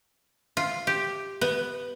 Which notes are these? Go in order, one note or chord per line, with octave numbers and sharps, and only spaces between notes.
F4
G4
B3